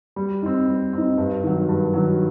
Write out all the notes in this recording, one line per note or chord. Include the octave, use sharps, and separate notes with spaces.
G3
C4 D#4
G3
C4 D#4
G2
D#3 F#3
G2
D#3 F#3